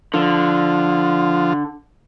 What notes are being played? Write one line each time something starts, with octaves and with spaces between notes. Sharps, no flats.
D3 F3 F4